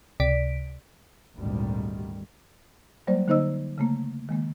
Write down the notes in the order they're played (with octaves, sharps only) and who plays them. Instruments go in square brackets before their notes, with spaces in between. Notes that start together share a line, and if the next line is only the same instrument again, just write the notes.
[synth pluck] C#2 C3 D5 B6 D7
[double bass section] G#1 D2 A#2 D#3 G3
[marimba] F#3 G3 A#3 C5 D5
D3 A#3 D#4 C5 D#5 E6
C#3 A3 A#3
D#3 G#3 A#3